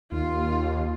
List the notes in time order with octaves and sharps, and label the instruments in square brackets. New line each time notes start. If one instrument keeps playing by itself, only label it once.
[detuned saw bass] D#2 [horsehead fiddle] F4